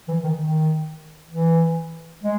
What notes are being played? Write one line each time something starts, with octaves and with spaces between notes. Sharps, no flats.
E3
D#3
D#3
E3
G#3